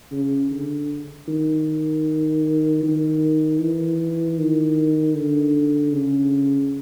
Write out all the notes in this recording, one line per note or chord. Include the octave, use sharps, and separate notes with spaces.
C#3
D3
D#3
D#3
E3
D#3
D3
C#3